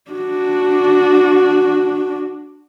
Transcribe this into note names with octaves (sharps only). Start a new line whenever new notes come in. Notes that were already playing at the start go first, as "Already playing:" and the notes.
D4 F#4